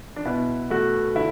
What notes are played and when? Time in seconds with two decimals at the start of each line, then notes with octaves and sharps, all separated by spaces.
0.16 D4
0.25 B2 E4
0.70 A3 F#4
1.15 D3 E4